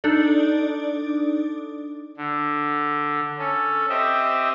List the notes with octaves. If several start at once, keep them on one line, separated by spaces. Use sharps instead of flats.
D4 D#4 A4 D5
D3
C#4 A4
C4 G4 D#5 E5